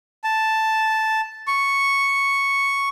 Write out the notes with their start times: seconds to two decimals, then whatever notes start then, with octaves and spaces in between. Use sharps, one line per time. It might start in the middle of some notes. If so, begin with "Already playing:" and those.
0.24 A5
1.47 C#6